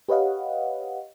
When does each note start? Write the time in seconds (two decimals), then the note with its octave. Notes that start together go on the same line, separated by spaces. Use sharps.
0.09 G4 B4 C#5 D#5 F5 F#5